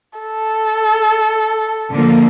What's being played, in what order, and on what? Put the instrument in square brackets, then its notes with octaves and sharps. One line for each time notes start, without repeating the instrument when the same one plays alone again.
[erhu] A4
[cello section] D3 F3 A#3